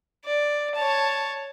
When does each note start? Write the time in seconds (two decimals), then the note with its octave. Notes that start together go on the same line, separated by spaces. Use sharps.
0.25 D5
0.75 C#5 A5